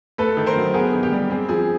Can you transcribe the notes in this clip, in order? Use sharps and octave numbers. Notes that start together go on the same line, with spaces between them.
A3 A4 B4
D#3
A#4 C5
F#3
B3 G#4 A#4
D#3
G4
G3
C4 G#4
F3 G#4